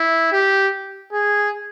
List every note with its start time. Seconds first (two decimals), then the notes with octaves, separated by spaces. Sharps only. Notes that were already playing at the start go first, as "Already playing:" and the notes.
Already playing: E4
0.32 G4
1.13 G#4